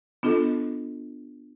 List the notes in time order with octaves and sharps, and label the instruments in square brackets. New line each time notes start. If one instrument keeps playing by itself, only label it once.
[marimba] B3 D4 F4 A4 D#5